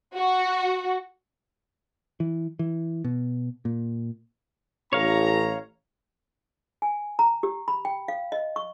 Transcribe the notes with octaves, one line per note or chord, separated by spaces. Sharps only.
F#4
E3
E3
B2
A#2
A1 C#5 F5 A#5
G#5
A#5
G4
B5
G5
F5
D#5
C#6